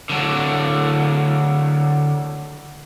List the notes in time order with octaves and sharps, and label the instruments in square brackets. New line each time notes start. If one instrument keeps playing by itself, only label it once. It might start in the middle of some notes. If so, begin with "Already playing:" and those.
[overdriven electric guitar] D3 F#3